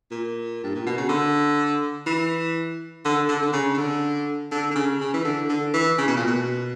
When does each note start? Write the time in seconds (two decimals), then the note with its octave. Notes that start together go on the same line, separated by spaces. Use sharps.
0.11 A#2
0.64 G2
0.75 A#2
0.86 B2
0.97 C#3
1.09 D3
2.06 E3
3.05 D3
3.29 D3
3.42 D3
3.53 C#3
3.74 C#3
3.77 D3
4.51 D3
4.71 D3
4.75 C#3
5.00 C#3
5.14 E3
5.25 D3
5.49 D3
5.74 E3
5.98 C#3
6.08 B2
6.17 A#2
6.27 B2